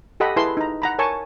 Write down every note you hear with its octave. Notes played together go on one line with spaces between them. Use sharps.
G4 A4 D#5 F#5 B5
E4 G#4 B4 A5 C6
D#4 A#5
F#5 A#5 B5
A#4 C#5 G#5 A5 C#6